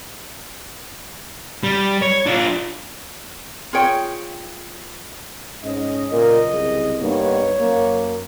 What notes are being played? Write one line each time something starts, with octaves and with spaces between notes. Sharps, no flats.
G3
C#5
D4 F4
F4 G#4 C#5 G5
G#2 C#4 D#5
B1 A#2 C#3 A#4 D#5
C2 G#4
G2 A#3 B3 D#4 C#5
F#2 A#3